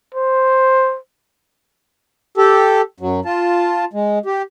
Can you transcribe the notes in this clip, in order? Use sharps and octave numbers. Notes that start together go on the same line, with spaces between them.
C5
G4 A4
F#2 F#3
F4 A5
G#3
G4